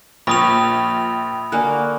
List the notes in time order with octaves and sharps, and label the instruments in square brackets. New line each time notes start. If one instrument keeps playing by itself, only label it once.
[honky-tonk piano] A#1 [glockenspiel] B5 D#6 F7 [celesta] C#6
[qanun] D3 A#3 F#4 [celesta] D5 G#5 F#6